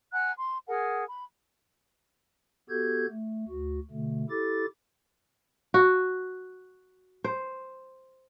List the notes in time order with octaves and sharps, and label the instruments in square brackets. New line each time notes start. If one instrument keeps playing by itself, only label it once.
[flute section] F#5 G#5 A#5 F#6
C6
G#4 A#4 F#5 G#5
B5
[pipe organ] B3 F#4 G4 A4 G6 G#6
A3
D2 F#4
B2 D3 A3
E4 G4 A4 D6 A6
[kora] F#4
C5